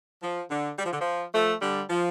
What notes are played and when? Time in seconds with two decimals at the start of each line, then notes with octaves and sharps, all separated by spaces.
0.23 F3
0.50 D3
0.79 G3
0.85 F3
0.92 D3
1.00 F3
1.33 F3 A3
1.62 D3 G3
1.90 F3